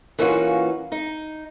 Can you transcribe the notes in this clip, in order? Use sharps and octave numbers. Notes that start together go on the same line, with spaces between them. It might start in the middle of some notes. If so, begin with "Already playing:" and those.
E3 A#3 C#4 D#4 F4 F#4
D#4